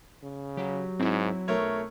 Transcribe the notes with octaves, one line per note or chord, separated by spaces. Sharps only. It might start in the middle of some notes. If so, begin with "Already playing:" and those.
C#3
F#3 G4
G#2 C4 E4
B1 A3 A#4 C#5